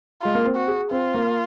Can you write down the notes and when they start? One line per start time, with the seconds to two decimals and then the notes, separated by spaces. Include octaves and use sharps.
0.22 G#3 F4
0.35 A#3
0.45 C4
0.56 F#4
0.68 G#4
0.91 C4 F4
1.14 A#3